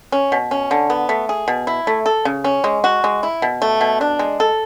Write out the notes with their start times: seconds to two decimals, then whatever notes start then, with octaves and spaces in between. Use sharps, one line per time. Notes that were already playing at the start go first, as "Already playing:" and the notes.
0.12 C#4
0.32 B2
0.51 C#4
0.71 D3
0.90 B3
1.09 A3
1.29 G#4
1.48 B2
1.67 E4
1.87 A3
2.06 A4
2.25 C#3
2.44 C#4
2.64 G#3
2.84 F#4
3.04 G#3
3.23 E4
3.42 B2
3.62 A3
3.81 B2
4.01 D4
4.19 G#3
4.40 A4